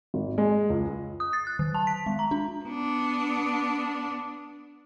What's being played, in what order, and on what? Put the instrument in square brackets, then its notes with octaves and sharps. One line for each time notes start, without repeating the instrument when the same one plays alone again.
[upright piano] G#1
G#3
C#2
[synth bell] D#6
A6
F#6
D#3
A5
B6
G#3
A#5
D4
[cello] B3 D4